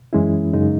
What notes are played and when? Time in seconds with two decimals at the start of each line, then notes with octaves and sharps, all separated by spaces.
0.13 F#2 E3 G#3 C#4 E4
0.53 F#2 C#3 G#3 D#4